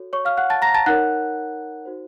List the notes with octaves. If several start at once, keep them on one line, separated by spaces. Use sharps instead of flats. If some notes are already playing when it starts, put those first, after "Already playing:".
Already playing: F#4 A4 C#5
C#5 C#6
F5 F6
F#5 F#6
A5 A6
A#5 A#6
A5 A6
D#4 A#4 C#5 F#5 F#6
D#4 F#4 C5